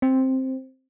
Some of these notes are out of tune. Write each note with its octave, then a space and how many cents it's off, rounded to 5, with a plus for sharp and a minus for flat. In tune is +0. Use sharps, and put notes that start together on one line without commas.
C4 +5